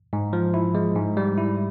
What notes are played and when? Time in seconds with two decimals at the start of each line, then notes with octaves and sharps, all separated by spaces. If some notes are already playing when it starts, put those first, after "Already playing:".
0.13 G#2
0.33 F3
0.54 E4
0.75 G#3
0.96 G#2
1.17 G3
1.38 E4